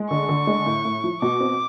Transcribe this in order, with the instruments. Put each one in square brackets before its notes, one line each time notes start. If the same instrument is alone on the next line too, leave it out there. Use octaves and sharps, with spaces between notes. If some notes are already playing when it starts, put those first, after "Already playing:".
Already playing: [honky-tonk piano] G#3
[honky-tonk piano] D3 [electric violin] C#6
[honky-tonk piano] D3
G#3
A2
A2
F3
[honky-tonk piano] B2 [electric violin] D6
[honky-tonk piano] C4